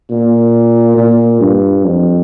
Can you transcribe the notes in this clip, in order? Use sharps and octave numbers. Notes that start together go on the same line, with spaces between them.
A#2
A#2
G2
F2